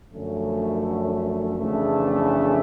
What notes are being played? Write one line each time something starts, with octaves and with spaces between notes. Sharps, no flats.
F#2 D3 F3 A3 C#4
F2 C#3 E3 A3 D4